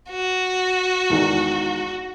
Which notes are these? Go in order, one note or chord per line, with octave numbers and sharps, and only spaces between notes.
F#4
E2 G#2 D#3